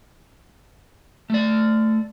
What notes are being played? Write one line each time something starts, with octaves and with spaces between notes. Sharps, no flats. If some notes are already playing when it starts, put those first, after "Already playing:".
A3 D5